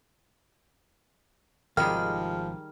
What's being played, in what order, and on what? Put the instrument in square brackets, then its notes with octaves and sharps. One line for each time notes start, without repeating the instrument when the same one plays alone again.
[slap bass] G#1 C3 [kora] D#3 G3 G#4 [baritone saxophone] F3 [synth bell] G5 F6